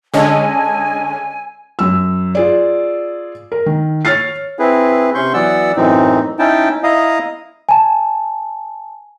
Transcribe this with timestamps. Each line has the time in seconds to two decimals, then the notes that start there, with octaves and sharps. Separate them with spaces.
0.14 D3 G#3 C#4 D#5 G#5 A5 E6
1.79 F#2 E6
2.35 F4 G#4 D5
3.52 A#4
3.66 D#3
4.05 C#5 F6 A6 C7
4.59 C4 E4 G#4 B4
5.15 C3 C#4 C6 C#6 G6
5.34 E3 F#3 B3 D5 F#5 E6
5.76 F#2 A2 E3 C4 D#4
6.39 C#4 D#4 E4 G5 A5
6.84 E4 D#5 F5 A#5 D#6
7.69 G#5 A5